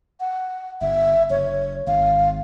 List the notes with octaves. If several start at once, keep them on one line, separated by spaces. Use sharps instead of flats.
F#5
G1 E5
F#1 C#5
G#1 F5